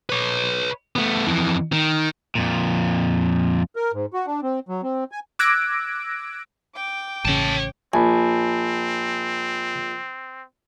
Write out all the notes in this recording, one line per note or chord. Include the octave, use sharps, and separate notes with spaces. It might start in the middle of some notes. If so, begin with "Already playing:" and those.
B4 C#5
A3 B3
F2 E3
D#3
F2 A#2
A#4
G#2
F#4
D4
C4
F#3
C4
G#5
D6 E6 F#6 G#6 A#6 D7
G5 D6
A1 C#3 C#5 A5
A#1 C4 G#5 A5 B5